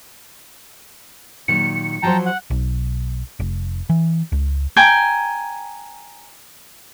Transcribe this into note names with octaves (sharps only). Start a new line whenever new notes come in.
A#2 D#3 F#3 C#7
F3 F#3 C5 G5 A5 A#5
F#5
B1
F1
E3
C#2
G5 G#5 A#5